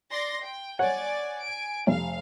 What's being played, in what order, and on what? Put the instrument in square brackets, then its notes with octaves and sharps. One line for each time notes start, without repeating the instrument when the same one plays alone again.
[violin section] D5 C6 A#6
G5
[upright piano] C#5 F#5 [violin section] D5 G#5
[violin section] G#5 D7
[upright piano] F1 [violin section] F5